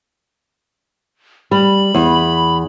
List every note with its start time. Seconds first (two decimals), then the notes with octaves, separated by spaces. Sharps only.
1.51 G3 B5
1.94 E2